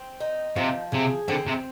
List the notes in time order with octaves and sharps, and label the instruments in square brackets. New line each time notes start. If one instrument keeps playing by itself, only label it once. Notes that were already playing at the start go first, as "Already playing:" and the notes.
Already playing: [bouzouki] C4
D#4
[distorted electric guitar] C3 [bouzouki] F3
[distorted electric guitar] C3 [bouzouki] G#4
[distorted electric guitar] D3 [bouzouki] C4
[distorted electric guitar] C3